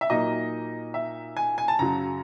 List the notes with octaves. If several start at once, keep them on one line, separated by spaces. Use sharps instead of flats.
E5
A#2 F#3 A#3 D#4 D#5
E5
G#5
G#5
A5
F#2 C#3 F#3 A#5